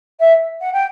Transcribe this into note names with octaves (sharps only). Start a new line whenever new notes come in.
E5
F#5
G5